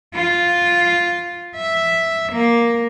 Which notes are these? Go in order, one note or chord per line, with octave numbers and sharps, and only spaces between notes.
F4
E5
A#3